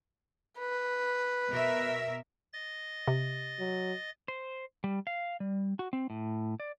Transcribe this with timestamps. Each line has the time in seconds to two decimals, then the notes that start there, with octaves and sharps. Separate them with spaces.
0.59 B4
1.50 B2 A#4 E5
2.53 D#5 A6
3.08 C3
3.59 F#3
4.28 C5
4.84 G3
5.07 F5
5.40 G3
5.79 F#4
5.93 C4
6.10 A2
6.60 D5